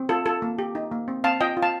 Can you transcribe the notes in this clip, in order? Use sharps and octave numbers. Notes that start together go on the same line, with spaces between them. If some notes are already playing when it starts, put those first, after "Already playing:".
Already playing: C4
F4 A4
F4 A4
A#3
G4
D#4
A#3
C4
C4 F5 A5
F4 D#5 G5
F4
F5 A5